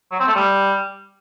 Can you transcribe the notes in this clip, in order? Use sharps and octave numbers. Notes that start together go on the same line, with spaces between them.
F#3
C4
A3
G3